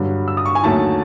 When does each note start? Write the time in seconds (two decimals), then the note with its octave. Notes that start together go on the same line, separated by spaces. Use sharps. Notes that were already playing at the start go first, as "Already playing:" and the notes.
Already playing: G2 D3 F#3
0.28 E6
0.37 D#6
0.46 C#6
0.55 G#5
0.64 D#2 D3 F#3 A3 A5